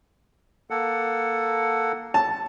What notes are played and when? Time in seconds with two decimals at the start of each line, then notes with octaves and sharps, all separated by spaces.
0.70 A#3 A4 F#5
2.14 A5